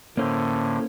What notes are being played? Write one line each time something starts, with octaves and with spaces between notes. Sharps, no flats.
A2 D3 A#3 C#4 C5